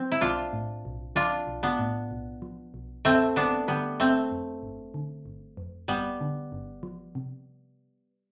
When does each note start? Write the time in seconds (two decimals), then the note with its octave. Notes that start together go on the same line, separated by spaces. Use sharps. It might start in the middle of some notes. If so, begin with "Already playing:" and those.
Already playing: F3 C4
0.12 E4
0.21 B1 D4 F4
0.53 A2
0.85 B1
1.16 F3 D4 F4
1.47 B1
1.63 B3 D4
1.79 A2
2.11 B1
2.42 F3
2.74 B1
3.05 F2 A3 C4
3.36 G1 B3 D4
3.68 D3 G3 B3
4.00 G1 A3 C4
4.31 F2
4.63 G1
4.94 D3
5.26 G1
5.57 F2
5.88 G1 G3 B3
6.21 D3
6.52 G1
6.83 F3
7.15 C3